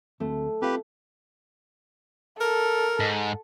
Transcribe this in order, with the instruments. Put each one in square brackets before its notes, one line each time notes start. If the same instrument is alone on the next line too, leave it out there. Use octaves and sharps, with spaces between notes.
[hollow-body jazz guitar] D2 C4 [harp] A3
[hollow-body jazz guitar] C4 F4 F5 [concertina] G4 B4
[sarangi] A4 [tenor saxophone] A#4
[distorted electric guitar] G#2